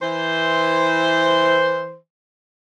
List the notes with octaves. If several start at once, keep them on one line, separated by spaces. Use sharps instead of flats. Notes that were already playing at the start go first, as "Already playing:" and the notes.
E3 C5